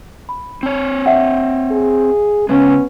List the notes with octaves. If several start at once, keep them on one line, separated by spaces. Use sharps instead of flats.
B5
C4 C#5
E5 F#5 G5
G#4
C#3 G#3 B3 C#4